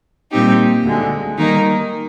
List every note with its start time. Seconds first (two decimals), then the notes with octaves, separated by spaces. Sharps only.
0.31 A#2 G3 C4 D#4 G4
0.84 D2 D3 G#3
1.37 D#3 G3 A#3 D#4 A#4